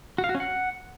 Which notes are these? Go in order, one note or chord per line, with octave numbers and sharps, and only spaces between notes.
F#4
F5
F#4
C#4
F#5